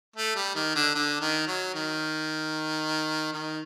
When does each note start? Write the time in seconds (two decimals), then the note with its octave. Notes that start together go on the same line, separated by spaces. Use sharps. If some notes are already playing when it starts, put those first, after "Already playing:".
0.16 A3
0.35 G3
0.55 D#3
0.75 D3
0.95 D3
1.21 D#3
1.47 F#3
1.74 D#3
3.32 D#3